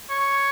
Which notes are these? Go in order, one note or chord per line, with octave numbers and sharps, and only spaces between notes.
C#5